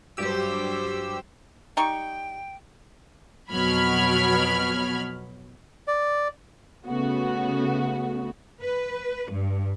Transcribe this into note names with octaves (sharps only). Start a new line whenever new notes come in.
G2 F#3 G3 G4 C5 E6
G3 D#4 G5 C#6
F2 B2 F#3 B5 F6 G#6
D5
C#3 A3 B3 F#4
B4
G2